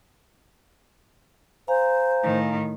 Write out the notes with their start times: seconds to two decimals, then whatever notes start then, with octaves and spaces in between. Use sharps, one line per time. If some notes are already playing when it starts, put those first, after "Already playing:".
1.68 C5 F5 G#5 A#5
2.23 A2 D#3